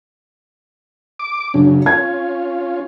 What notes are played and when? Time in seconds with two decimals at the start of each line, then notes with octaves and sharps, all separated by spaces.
1.19 D6
1.54 F#2 C#3 D4
1.86 C#4 F4 G#6